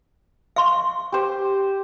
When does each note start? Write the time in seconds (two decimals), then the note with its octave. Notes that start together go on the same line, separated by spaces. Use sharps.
0.56 F5 C6 C#6
1.12 G4 C5